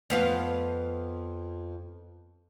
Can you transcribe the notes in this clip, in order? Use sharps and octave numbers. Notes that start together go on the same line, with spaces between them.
F2 B3 F4